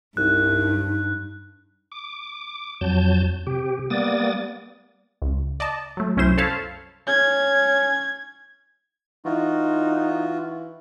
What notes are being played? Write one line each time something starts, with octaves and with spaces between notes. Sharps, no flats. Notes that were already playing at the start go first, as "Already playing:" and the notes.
C2 G2 D#4 F#6
D6
F2 F#3 A5 G6
C3 G4
G3 A#3 B3 D5 D#6 A6
C#2
D5 D#5 A5
F#3 A3
C2 F#2 C#4 E4 C5 E7
A4 C5 C#5 F5 A5 B5
C#4 G#6
E3 D#4 F4 F#4